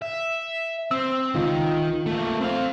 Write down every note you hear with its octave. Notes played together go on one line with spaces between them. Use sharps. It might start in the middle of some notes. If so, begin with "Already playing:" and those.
E5
C4 E6
C#2 D#3 F4
A3 A#3
C4 F5